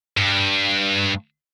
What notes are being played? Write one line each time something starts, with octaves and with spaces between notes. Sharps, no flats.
G2